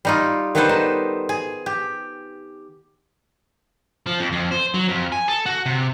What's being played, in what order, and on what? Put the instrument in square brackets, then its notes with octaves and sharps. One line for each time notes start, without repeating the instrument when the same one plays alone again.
[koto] G3 D#4 F4
D#3 G3 B3 A4 B4 C5
D#4
G#4
G4
[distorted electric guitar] F3
F2
F2
C5
F#3
F2
G#5
A4
F#4
C3